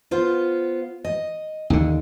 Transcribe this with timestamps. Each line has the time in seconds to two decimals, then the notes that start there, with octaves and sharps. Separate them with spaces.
0.11 B3 F4 C5
1.04 D#5
1.70 D#2 D3